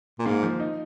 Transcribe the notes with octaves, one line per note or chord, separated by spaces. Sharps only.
A#2
G#2 A#3
F3
D#4